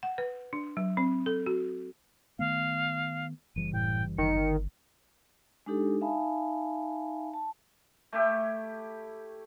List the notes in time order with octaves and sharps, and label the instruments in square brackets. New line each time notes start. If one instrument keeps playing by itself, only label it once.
[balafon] F#5
B4
D4
F#3
C4
A4
F#4
[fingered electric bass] D#3 A3 B3 [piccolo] F5
[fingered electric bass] F#1 E3 G3 [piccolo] D#7
[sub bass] A2 [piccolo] G5
[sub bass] G1 [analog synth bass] D#3 [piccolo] C#7
[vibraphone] G#3 D4 D#4 G4 A4
D#4 E5 F5 G#5 A5 B5
A5
[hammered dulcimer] A3 E4 G4